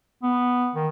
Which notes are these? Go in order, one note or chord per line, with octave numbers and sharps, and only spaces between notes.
B3
D#3